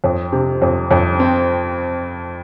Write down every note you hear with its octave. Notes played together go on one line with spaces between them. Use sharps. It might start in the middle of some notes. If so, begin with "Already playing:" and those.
F2
C3
F2
F2
C4